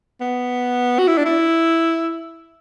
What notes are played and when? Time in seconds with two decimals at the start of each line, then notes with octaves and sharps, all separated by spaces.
0.21 B3
0.99 F#4
1.07 E4
1.18 D4
1.26 E4